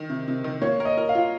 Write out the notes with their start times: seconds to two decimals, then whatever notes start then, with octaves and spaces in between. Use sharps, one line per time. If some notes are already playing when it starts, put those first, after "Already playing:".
Already playing: D#3
0.09 C3
0.28 C3
0.44 D#3
0.62 A#3 C#5
0.80 A#4
0.85 D#5
0.97 A#4
1.09 F5
1.15 F4